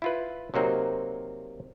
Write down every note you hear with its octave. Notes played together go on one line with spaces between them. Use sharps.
E4 F4 B4
C3 F#3 A#3 C4 D#4